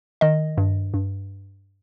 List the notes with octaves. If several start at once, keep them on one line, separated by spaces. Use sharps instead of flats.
D#3 D#5
G2
G2